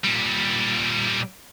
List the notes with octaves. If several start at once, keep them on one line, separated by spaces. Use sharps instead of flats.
A#2 G3